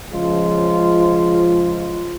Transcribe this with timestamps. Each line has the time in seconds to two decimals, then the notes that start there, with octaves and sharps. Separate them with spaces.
0.12 C#3 F3 G#3 F4